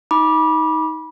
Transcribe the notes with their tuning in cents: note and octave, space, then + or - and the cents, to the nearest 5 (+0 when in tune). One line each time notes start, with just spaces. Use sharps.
D#4 +20 B5 -25 D6 +0